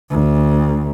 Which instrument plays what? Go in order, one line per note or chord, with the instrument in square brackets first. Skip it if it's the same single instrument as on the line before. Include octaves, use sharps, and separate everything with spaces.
[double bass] D2